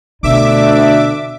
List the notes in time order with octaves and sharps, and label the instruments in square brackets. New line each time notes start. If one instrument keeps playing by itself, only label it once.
[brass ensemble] D2 D4 [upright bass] B2 [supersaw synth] E5 D6